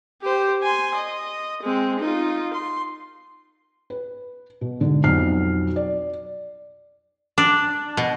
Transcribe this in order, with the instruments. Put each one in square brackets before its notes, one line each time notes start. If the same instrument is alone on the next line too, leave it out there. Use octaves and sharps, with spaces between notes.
[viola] G4 C5
G#5 C6
D#5
G#3 C4
D#4 F4
C6
[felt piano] B4
B2
G#2 D3
B1 F2 F#3 F6 C7
D5
[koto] D4
B2